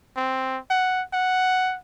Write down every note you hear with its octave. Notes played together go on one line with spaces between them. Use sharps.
C4
F#5
F#5